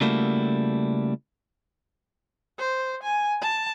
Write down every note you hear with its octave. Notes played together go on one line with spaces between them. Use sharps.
C#3 G3 A3 A#3 E4 F#4
C5
G#5
A5